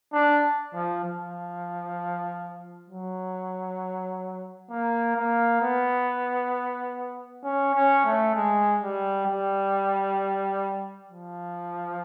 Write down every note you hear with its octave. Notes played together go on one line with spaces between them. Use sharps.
D4
F3
F3
F#3
A#3
A#3
B3
C#4
C#4
A3
G#3
G3
G3
F3